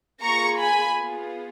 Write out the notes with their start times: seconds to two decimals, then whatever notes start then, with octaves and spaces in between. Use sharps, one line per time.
0.23 A#3 F4 G#4 A#5 C#6
0.60 G#5 B5
0.96 B3 F4 G#4